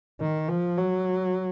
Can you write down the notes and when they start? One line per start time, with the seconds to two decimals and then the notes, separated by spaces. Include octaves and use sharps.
0.21 D#3
0.49 F3
0.78 F#3